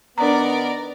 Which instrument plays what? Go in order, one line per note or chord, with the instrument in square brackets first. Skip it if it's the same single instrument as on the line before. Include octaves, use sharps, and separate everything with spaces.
[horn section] D#3 B3 [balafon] D4 A#5 [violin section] A#4 D5